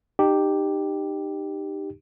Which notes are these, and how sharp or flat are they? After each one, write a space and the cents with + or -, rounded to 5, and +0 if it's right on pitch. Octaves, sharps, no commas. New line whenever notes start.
D#4 -30 G4 +0